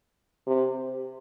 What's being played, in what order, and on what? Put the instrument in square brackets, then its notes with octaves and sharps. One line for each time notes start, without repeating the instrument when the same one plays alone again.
[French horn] C3